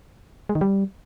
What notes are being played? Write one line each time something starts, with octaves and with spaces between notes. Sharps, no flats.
G#3
D#3
G3